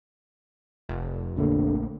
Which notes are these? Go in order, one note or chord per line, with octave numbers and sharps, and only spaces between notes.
F1
A#1 D3 A3 A#3